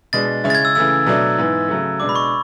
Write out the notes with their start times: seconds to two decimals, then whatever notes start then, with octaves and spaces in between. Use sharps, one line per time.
0.13 B2 G#3 D4 A6
0.44 C#3 G#3 C#4 E4
0.50 A6
0.55 G#6
0.65 E6
0.75 C#3 E3 A3 E4 E6
1.06 B2 F#3 A3 D4
1.38 G#2 E3 B3
1.68 C#3 F#3 A3
2.00 B2 G#3 D4 D6
2.09 B5
2.16 C#6